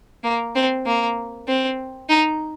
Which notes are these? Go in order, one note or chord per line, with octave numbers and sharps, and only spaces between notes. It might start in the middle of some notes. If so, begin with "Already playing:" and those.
A#3
C4
A#3
C4
D#4